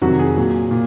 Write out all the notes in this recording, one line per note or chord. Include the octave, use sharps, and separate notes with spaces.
F2 C3 D#3 F#3 F#4
G#4
A#2 F#3
A#2